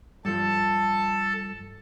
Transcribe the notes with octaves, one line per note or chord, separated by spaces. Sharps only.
G2 F3 A4 A5